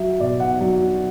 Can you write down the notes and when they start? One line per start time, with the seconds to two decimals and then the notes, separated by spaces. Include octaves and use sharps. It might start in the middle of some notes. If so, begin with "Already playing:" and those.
Already playing: F#3 E5
0.20 B2 D5
0.40 F#5
0.60 F#3